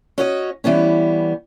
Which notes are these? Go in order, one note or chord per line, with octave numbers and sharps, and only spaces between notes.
C#4 F#4 C#5 D#5
E3 G3 B3 C#4